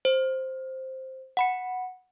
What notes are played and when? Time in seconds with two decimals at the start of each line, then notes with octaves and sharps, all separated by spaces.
0.05 C5
1.37 F#5 B5 C#7